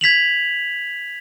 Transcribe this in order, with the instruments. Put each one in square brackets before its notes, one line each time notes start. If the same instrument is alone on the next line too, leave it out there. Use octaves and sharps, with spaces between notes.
[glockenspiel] G#6 B6 F7 F#7